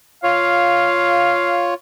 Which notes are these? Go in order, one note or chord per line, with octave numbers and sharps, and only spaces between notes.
F4 C#5 F5